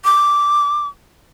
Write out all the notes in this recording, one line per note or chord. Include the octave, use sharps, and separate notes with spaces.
D6